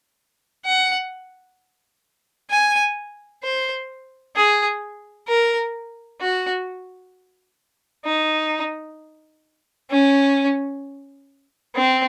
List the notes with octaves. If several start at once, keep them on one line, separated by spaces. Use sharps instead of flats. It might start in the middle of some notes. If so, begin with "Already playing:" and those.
F#5
G#5
C5
G#4
A#4
F#4
D#4
C#4
C4